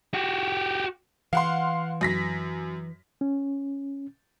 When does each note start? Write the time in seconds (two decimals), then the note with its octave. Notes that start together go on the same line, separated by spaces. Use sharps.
0.14 F#4 G4
1.33 E3 F5 F#5 C6
2.01 F#2 A#6 B6
3.21 C#4